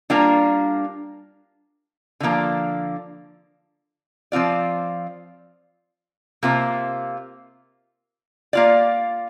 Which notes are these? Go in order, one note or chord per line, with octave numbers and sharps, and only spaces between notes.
G3 A#3 D4 F4 A#4
D3 F3 A#3
F3 C4 F4 D5
C3 A#3 F4 C5
A#3 F4 D5